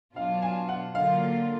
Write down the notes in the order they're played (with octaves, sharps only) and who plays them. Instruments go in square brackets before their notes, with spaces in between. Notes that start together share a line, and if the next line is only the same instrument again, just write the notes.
[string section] B2 F#3 D4 F4 [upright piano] F5
[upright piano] G#5
F#5
[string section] D3 F#3 A#3 F4 [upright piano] F5